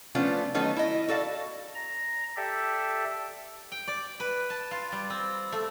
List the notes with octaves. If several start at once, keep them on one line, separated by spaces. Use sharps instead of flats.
F3 A3 B3 C#4 D4 F4
D#3 F#3 A3 B3 C#4 D#4
E4 D#5
F#4 A4 D5 F5
A#5
G4 A4 D5 E5
G5
D5
B4
A5
F4
G3
C4
A3